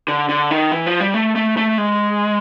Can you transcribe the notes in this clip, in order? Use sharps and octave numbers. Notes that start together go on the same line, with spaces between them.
D3
D3
D#3
E3
F3
G3
A3
A3
A3
G#3